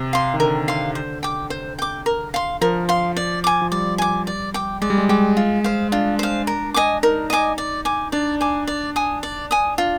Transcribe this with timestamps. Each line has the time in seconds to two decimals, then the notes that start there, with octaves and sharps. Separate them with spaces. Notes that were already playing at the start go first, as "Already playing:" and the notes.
Already playing: C3
0.13 F5 C6
0.34 D#3
0.40 D3 A#4
0.68 F5 C6
0.95 C5
1.23 G5 D6
1.50 C5
1.79 G5 D6
2.06 A#4
2.34 F5 C6
2.61 F3 A#4
2.89 F5 C6
3.17 D5
3.44 G#5 D6
3.62 F3
3.72 G3 D5
3.98 G#5 D6
4.27 D5
4.54 G5 D6
4.82 G#3 D5
4.90 G3
4.98 G#3
5.09 G#3 G5 D6
5.37 F4
5.64 C5 F5
5.92 D4 F4
6.19 C5 F5
6.47 A#4
6.74 D#5 G#5 D6
7.03 D#4 A#4
7.30 D#5 G#5 D6
7.58 D5
7.85 G#5 D6
8.12 D4 D5
8.41 G#5 D6
8.67 D5
8.96 G#5 D#6
9.23 D5
9.51 G#5 D#6
9.78 D4 F4